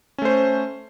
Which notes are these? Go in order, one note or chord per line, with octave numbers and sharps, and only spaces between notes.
A3 C#4 C5